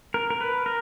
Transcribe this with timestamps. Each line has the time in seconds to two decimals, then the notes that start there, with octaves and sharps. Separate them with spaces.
0.14 A#4
0.30 A#4
0.41 B4
0.66 A#4